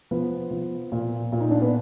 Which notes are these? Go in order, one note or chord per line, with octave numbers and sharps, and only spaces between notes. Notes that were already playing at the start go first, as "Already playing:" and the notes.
F3 B3
F3
A#2
A#2
D#4
D4
B3